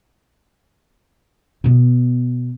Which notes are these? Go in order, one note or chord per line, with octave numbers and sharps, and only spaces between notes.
B2 B3